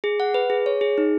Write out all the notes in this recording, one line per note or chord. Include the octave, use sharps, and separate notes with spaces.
G#4
F#5
B4
G#4
C#5
G#4
D#4